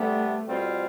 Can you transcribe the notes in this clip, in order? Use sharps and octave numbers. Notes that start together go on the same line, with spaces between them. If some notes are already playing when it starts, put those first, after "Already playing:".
Already playing: C3 G3 A3 B3 D4
B2 G3 C4 F4